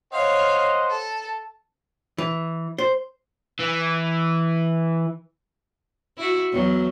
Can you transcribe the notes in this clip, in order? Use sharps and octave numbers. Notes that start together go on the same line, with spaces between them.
C5 C#5 D#5 F5 F#5
A4
E3
C5
E3
E4 F#4
E2 F#3